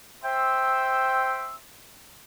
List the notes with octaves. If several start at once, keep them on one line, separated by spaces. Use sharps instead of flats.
C5 E5 G5 C6 E6